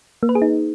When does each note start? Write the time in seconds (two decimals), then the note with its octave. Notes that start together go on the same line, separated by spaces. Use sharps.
0.23 A#3
0.29 B4
0.35 G#4
0.42 D#4